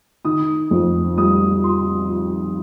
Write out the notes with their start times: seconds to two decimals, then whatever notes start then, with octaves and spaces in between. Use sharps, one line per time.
0.25 D#3 D#6
0.71 F2
1.17 G3 D#6
1.64 C6